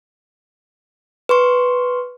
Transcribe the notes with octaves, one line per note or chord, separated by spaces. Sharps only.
B4 C6 C#6